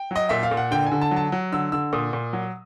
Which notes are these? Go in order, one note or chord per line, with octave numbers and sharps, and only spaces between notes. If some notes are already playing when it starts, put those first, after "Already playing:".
Already playing: G5
F#3 D#5
A#2 E5
F5
A#2
F#5
D3 G5
G#5
D3
A5
F#3
A5
F#3
D3 E6
D3 E6
A#2 D#6
A#2
F#3